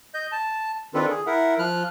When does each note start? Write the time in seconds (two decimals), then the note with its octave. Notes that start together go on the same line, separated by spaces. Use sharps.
0.14 D#5 G6
0.32 A5
0.94 D#3 C4 D4 F4 A4 B4
1.10 G#4
1.27 E4 A#4 E5 F#5
1.59 F3 F6 F#6